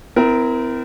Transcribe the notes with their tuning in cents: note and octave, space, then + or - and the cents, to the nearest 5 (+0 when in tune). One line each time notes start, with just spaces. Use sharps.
C4 -40 E4 +0 A#4 +0